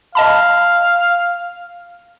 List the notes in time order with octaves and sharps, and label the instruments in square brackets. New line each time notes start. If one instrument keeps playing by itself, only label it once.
[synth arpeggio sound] D#5 A5 B5 [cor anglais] F5